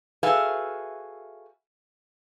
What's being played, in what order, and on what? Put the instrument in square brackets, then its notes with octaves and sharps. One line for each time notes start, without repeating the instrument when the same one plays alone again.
[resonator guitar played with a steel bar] F#4 G#4 A4 B4 E5 F5